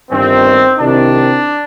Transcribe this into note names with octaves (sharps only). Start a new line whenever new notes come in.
G1 G2 D#3 C4
C2 C3 D#3 D4